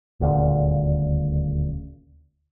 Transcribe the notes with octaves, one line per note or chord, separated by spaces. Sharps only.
D#1 D2 A#2 C#3